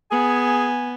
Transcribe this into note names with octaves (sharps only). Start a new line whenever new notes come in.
B3 G#4 G#5